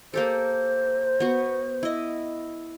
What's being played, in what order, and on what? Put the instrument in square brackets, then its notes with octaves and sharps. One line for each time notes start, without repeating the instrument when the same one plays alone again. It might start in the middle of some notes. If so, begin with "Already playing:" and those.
[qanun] A#3 G4 A4 [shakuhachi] C5
[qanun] B3 F#4
E4 D#5